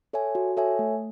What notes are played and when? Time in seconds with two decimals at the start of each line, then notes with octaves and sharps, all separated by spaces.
0.13 A4 C#5 E5 G#5
0.35 F#4
0.57 A4 C#5 E5 G#5
0.79 A3